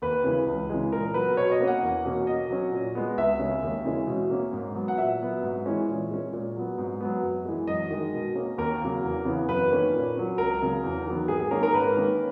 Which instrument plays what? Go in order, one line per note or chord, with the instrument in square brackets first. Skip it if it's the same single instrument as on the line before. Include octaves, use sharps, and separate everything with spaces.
[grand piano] D#2 B4
C#3 E3 G#3
C#2
C#3 E3 G#3
A#2 A#4
F#3 B3 B4
B2 C#5
D#5
A#3 C#4
F#5
E2
B2 A#3 C#4
B2 D#5
F#3 C#4
A#2
G#3 B3
C#2 E5
C#3 G#3 C#4
D#2
C#3 E3 G#3 C#4
B2
A#3 C#4
G#2
F#3 B3
F#5
A#2 E5
F#3 B3
G#2
E3 G#3 C#4
A#2
G#3 C#4
A#2
F#3 B3
G#2
F#3 B3
F#2
E3 G#3
F#2 D#5
D#3 G#3
B2
A#3 C#4
D#2 A#4
C#3 F#3 A#3
E2
C#3 E3 B3
F#2 B4
D#3 A#3 C#4
A#2
F#3 C#4
C#2 A#4
C#3 F#3
E2
D#3 F#3 B3
G#2 G#4
G#4
D#3 A#3 C#4 A#4
A#4
G#2 B4
D#3 A#3 C#4